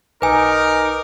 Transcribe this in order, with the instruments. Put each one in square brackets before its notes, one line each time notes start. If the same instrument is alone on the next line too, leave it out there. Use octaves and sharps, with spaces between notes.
[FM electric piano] B1 [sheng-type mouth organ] D#4 D6 [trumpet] A#4 [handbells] B4 G#5